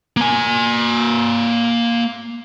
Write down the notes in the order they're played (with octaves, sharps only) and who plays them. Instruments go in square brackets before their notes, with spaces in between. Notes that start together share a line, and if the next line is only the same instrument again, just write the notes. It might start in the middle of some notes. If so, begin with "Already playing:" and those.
[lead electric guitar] A#3 G#5